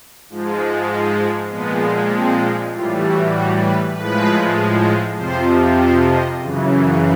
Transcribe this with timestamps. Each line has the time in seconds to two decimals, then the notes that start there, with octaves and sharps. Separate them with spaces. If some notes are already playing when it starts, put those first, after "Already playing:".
0.29 G#2 F3 G#3
1.51 A#2 F3 G#3 B3
2.13 C4
2.73 A2 E3 G3 F4
3.03 F#4
3.34 F#4
3.64 B4
3.95 A2 F3 G#3 B4
5.16 F2 C3 F3 C5
5.78 C5
6.08 D#5
6.39 F#2 C#3 E3